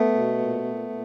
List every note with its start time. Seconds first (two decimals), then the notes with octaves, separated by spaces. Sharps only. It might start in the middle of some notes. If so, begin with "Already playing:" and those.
Already playing: A3 B3
0.14 B2
0.38 A#2
0.64 A#2
0.89 A#2